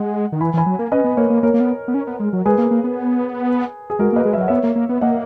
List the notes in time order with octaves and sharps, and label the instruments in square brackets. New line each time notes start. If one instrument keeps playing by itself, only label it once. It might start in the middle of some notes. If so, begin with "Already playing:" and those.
Already playing: [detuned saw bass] G#3 [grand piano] F#5
[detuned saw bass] D#3
[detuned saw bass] E3 [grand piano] G#5 B5
[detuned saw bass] E3 [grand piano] G#5 B5
[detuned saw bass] F#3
A#3
[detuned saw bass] C#4 [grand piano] B4 D#5
[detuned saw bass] B3
[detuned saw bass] A#3 [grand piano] A#4 C#5
[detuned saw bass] A#3
[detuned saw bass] A#3 [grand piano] A#4 C#5
[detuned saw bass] A#3
B3
B3
C#4
B3
G#3
F#3
[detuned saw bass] G#3 [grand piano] G#4 B4
[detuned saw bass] A#3
A#3
B3
[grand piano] G#4
[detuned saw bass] G#3 [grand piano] F#4 A#4
[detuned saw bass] A#3 [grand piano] B4 D#5
[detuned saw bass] G#3
[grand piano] E5
[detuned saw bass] F#3 [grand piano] F#5
[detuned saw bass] B3 [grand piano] C#5 E5
[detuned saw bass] A#3
A#3
B3
[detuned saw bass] A#3 [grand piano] D#5 F#5